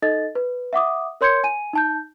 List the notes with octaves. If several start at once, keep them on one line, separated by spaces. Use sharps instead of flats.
D#4 A4 D#5 A6
B4
E5 F#5 D6 D#6
A#4 C#5 C6 G6 G#6 C#7
G#5 D#7
D#4 A5 G6